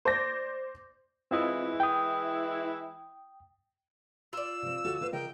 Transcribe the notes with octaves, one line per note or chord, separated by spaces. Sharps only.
C5 D5 D6 G6 A6 A#6
E3 G#3 C4 E4 F4 D#5
G5 D#6
F4 D5 E6
C3 C4
D2 F#4 A4
A#3 B4 C5
C#3 A#4 D#5 G5